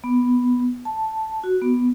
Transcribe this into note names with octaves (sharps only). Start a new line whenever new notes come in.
B3
A5
F#4
B3